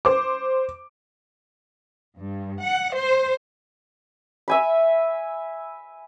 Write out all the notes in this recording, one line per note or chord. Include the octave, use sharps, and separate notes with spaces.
C5 D6
G2
F#5
C5
E5 G#5 B5